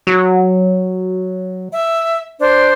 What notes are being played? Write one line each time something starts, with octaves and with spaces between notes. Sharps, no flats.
F#3
E5
D4 C5